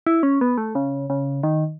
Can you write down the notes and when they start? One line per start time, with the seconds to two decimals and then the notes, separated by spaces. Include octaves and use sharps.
0.07 E4
0.23 C#4
0.41 B3
0.58 A3
0.75 C#3
1.10 C#3
1.43 D#3